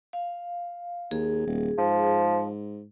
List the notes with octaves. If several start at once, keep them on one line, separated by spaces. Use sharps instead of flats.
F5
D#2 G#4
D#1
G#2 F3